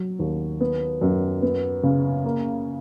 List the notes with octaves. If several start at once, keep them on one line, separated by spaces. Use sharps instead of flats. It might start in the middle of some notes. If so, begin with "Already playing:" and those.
Already playing: F#3
D#2
B3
F#2
B3
C#3
A#3